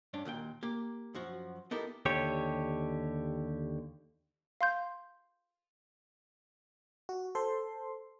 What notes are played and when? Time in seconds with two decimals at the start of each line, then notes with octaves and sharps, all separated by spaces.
0.14 G2 C#4 D4
0.25 D#2 A#2 F#5 G5
0.63 A#3 G4
1.15 F#2 F3 F#4
1.71 B3 D#4 E4 G4 A4 A#4
2.06 D#2 D3 G4 C#5
4.61 F5 C6 G6
7.09 F#4
7.35 A4 C5 C6